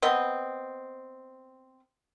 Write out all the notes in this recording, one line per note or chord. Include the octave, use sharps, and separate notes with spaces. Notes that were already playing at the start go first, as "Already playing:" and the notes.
B3 C4 D#5